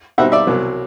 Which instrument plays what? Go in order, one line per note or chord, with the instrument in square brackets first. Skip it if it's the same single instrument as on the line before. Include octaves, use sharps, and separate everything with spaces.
[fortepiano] B2 G3 C4 D#4 E5 F#5
D5 E5
C2 B2 F#3